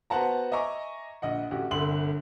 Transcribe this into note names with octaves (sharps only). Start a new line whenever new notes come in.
B3 F#4 C5 F#5 A5 A#5
D#5 E5 G#5 A#5 C#6 D6
A#1 D#5 F#5
A1 F#4 G4
G1 C2 D3 C6 F#7